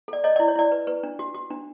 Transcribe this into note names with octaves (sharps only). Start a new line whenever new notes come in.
A4 D5
A4 C#5 D#5
D5
E4
C#5
E4 D5
B4
B4
D4
F#4
F#4
D4